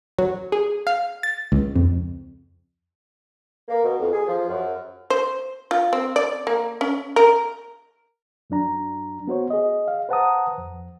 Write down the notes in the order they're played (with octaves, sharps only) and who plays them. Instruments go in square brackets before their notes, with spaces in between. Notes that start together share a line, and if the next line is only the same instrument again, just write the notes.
[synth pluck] F#3
G#4
F5
A6
C#2
F2
[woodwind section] A#3
B2
F2
G#4
F3
F#2
[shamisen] C5
F4
C4
D5
A#3
C#4
A#4
[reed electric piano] F#2 F#3 D4 A#5
B3 F#4 C5 C#5
G#4 D#5
F5
B4 C5 F#5 A5 A#5 D#6
F2